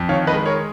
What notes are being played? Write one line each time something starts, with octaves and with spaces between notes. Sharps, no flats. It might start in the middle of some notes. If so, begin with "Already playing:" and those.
Already playing: F2
D#3 C#5 F5
B4 D#5
G#3
A#4 C#5